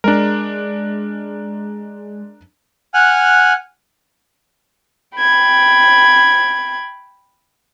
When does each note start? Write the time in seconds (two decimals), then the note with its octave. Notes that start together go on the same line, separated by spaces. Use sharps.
0.04 G#3 D4 A#4
2.94 F#5 G#5 F6 F#6
5.16 G5 B5 G#6